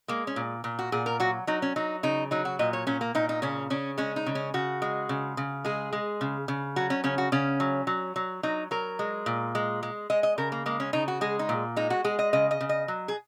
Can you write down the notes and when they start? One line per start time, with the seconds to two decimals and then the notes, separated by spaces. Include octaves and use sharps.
0.08 G#3 A#3
0.27 C#4
0.36 A#2
0.64 A#2
0.79 F#4
0.92 A#2 G#4
1.06 A#4
1.20 F#3 F#4
1.47 F#3 D#4
1.62 C#4
1.76 F#3 D#4
2.03 C#3 D#4
2.31 F#3 D#4
2.45 F#4
2.59 A#2 D#5
2.73 C#5
2.87 A#2 C#4
3.01 A#3
3.15 A#2 D#4
3.29 D#4
3.42 C#3 C#4
3.70 C#3 C#4
3.98 G#3 C#4
4.16 D#4
4.26 C#3
4.35 C#4
4.54 C#3 F#4
4.82 G#3
5.09 C#3
5.37 C#3
5.65 G#3 G#4
5.93 G#3
6.21 C#3
6.48 C#3
6.76 F#3 F#4
6.90 C#4
7.04 C#3 C#4
7.18 F#4
7.32 C#3 C#4
7.60 F#3
7.87 F#3
8.16 F#3
8.43 F#3 D#4
8.71 F#3 A#4
8.99 G#3
9.26 A#2
9.55 G#3
9.83 G#3
10.10 G#3 D#5
10.23 D#5
10.38 C#3 A#4
10.52 A#3
10.66 G#3 A#3
10.80 C#4
10.93 C#3 D#4
11.08 F#4
11.21 G#3 G#4
11.39 D#4
11.49 A#2
11.76 G#3 D#4
11.90 F#4
12.04 G#3 G#4
12.19 D#5
12.33 C#3 D#5
12.51 D#5
12.61 C#3
12.69 D#5
12.88 F#3
13.08 G#4